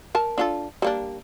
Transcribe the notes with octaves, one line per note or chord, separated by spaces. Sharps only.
A#4 A5
D4 F4 A4
G3 A#3 D4